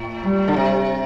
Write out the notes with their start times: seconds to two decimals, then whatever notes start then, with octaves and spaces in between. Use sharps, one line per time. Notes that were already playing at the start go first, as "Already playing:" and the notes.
Already playing: A2
0.24 G3
0.48 D3
0.56 C3